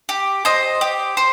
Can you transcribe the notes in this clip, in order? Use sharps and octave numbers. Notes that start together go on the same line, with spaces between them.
G4
C5 D#5
G4
C5